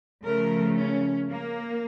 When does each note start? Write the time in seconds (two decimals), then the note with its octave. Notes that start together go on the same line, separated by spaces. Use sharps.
0.25 C#3 F3 A3 A#4
0.77 C#4
1.29 A#3